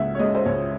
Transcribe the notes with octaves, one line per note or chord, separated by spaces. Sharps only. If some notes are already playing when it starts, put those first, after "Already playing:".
Already playing: C#2 C#3 E5 F#5
C#5
G#3 D#5
C5
C#2 C#5